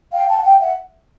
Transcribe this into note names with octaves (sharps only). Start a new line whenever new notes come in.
F5 G5
G5 A5
F#5
F5 G5
E5 F#5